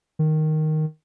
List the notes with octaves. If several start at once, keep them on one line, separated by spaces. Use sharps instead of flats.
D#3